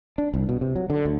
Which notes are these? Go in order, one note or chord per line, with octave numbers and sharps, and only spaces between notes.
D4
C2
B2
C3
F#3
D3
D2